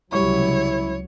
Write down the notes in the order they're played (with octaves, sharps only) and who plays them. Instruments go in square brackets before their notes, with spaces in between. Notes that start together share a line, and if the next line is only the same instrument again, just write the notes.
[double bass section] C#2 C3 F#3 [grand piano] G3 C#6 [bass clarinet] E4 [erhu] C#5